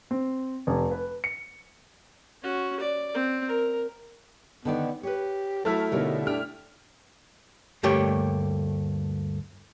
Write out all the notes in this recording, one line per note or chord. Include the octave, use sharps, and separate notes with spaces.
C4
F1
B4
C#7
C#4 F#4
D5
C4
A#4
D3 D#3 B3 D5
G4 B4 C#5
F#3 A3 E4 A5 F6
B2 D3 G3 D#4 A#4 C#5
D4 G5 F6
D2 G2 A3 A#3 G4 C#5